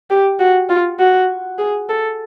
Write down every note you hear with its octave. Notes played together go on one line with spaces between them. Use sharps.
G4
F#4
F4
F#4
G#4
A4